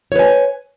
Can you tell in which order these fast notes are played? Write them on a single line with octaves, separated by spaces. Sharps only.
C#5 B4 G#5